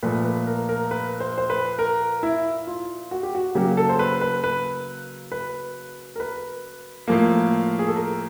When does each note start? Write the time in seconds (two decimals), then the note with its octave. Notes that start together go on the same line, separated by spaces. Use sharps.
0.03 A#2 F3 A3 B4
0.24 B4
0.47 A#4
0.69 A#4
0.91 B4
1.20 C5
1.38 C5
1.50 B4
1.79 A#4
2.23 E4
2.67 F4
3.11 F#4
3.23 G4
3.35 F#4
3.55 C#3 F#3 A#3 G4
3.77 A4
3.89 C5
3.99 B4
4.21 B4
4.44 B4
5.32 B4
6.16 A#4
6.20 B4
7.08 A2 F3 A#3
7.79 G#4
7.87 A4
7.96 A#4